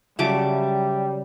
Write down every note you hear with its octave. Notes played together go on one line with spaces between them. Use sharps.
C#3 F#3 G3 E5 A5 D6